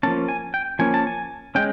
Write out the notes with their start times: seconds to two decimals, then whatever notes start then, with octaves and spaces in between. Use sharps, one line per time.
0.03 F3 A#3 C#4 A5
0.28 G#5
0.54 G5
0.79 F3 A#3 C#4 G#5
0.94 A5
1.07 G#5
1.55 G#3 C#4 G5